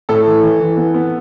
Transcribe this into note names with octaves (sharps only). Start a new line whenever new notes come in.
A2 A4
E3
E3
E3
B3
B3